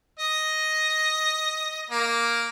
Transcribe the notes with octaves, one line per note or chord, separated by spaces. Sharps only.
D#5
A#3